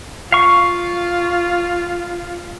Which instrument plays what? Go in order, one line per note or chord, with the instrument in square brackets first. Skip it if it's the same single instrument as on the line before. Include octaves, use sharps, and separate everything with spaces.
[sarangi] F4 [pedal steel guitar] F5 C#6